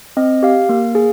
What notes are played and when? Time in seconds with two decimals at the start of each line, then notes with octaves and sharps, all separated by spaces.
0.17 C4 D#5
0.43 G4 F5
0.69 A#3
0.95 G#4